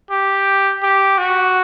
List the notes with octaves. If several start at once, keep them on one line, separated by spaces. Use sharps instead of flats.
G4
G4
F#4